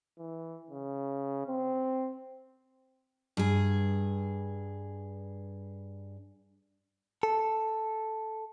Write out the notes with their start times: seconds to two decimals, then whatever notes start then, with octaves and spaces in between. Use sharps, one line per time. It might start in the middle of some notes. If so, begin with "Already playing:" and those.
0.18 E3
0.70 C#3
1.46 C4
3.37 G2 G#4
7.23 A4